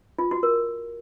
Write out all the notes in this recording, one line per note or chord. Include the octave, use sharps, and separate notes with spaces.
F4
F#4
A#4